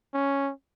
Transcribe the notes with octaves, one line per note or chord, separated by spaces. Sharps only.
C#4